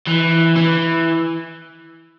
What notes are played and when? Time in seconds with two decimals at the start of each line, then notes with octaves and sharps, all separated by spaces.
0.07 E3
0.56 E3